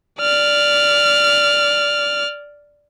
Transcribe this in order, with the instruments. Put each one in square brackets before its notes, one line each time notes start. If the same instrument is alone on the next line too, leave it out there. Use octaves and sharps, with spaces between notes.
[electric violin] D5 F6